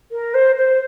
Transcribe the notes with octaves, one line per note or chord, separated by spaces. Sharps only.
A#4
C5
C5